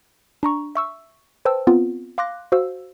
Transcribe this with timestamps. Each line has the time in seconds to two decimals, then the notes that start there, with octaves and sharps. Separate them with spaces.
0.43 D4 A#5 C#6
0.75 E5 C#6 E6
1.45 B4 C5 G5 A5 E6
1.67 B3 C4 F4
2.18 F5 C6 D6 F#6 A#6
2.52 F#4 C5 F5 E6